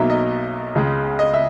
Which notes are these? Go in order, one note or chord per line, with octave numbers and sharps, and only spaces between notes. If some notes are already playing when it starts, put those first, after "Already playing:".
Already playing: B1 B2 F#3 A#3 D#4 E5
D#5
C#2 C#3 G#3
D#5
E5